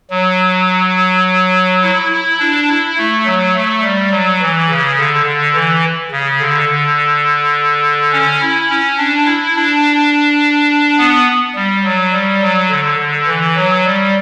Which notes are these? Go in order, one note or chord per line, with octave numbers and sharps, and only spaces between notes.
F#3
E4
E4
D4
E4
A3
F#3
A3
G3
F#3
E3
C#3
D3
D3
E3
C#3
D3
D3
C#4
E4
C#4
D4
E4
D4
B3
G3
F#3
G3
F#3
D3
D3
E3
F#3
G3